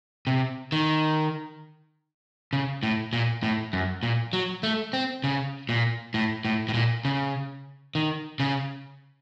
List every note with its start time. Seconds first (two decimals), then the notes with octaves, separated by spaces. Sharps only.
0.27 C3
0.72 D#3
2.53 C#3
2.83 A2
3.13 A#2
3.43 A2
3.73 F#2
4.03 A#2
4.33 F#3
4.63 A3
4.93 C4
5.24 C#3
5.69 A#2
6.14 A2
6.45 A2
6.69 A2
6.74 A#2
7.05 C#3
7.95 D#3
8.40 C#3